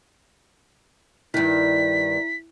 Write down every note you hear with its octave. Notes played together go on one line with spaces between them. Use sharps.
G2 D#3 E4 B6